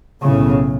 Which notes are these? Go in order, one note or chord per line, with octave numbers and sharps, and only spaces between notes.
B1 A2 C#3